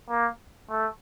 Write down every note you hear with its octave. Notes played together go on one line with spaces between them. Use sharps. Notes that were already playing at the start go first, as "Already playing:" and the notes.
A#3
A3